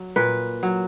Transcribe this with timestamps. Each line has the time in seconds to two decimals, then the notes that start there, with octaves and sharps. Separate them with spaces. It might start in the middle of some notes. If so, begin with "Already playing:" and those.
Already playing: F#3
0.16 A#2 B4
0.63 F#3